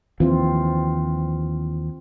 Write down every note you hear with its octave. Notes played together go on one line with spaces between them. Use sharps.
D#2 E3 F3 C4 F4